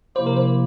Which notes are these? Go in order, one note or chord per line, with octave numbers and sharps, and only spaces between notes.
C3 F3 A#3 E4 G4 C5
A#4
C5